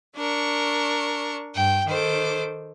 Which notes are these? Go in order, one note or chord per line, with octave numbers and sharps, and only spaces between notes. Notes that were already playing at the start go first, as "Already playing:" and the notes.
D4 A#4 C#6
G2 G5
D#3 A4 C5 D6